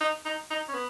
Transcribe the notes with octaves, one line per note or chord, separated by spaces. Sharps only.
D#4
D#4
D#4
C#4
B3